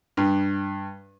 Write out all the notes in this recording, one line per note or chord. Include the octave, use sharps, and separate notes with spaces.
G2